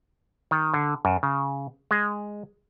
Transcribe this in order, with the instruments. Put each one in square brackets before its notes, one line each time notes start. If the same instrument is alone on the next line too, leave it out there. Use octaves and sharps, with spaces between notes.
[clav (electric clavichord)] D#3
D3
F#2
C#3
G#3